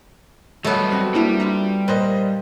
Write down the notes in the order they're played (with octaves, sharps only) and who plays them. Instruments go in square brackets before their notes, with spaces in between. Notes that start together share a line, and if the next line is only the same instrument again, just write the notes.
[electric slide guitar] F#3 G3 [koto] A3 B3 [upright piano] B4 C#5 D#5
[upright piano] C4 F#4
[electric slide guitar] G3 [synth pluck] A#3 D4 E4
[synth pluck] F4 E5 A#5
[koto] A#2 [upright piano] B4 C5 D#5